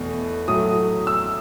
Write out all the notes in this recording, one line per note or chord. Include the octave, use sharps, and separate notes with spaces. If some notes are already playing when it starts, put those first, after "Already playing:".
Already playing: E2 B2 A3
A2 F#3 A3 D#6
E6